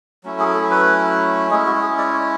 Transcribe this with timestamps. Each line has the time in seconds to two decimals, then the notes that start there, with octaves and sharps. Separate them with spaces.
0.24 F#3 A3 C#4 E4
0.39 G#4
0.55 A4
0.71 B4
1.50 G#3 C#4 E4 G#4
1.66 F#4
1.82 G#4
1.98 D5
2.14 C#5